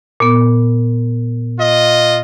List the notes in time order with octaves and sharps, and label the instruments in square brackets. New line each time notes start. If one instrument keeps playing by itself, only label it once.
[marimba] A#2 B3
[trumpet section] F4 D#5